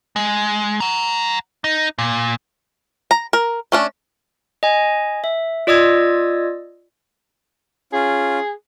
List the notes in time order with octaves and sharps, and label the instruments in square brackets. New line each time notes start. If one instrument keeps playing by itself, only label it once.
[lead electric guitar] G#3
F#5 A#5
D#4
A#2
[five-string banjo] A#5
A#4
A3 C#4 D4
[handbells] D#5 G#5
E5
F4 D5 D#5 D#6 E6 G#6
[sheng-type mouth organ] C#4 F4 [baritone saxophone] G#4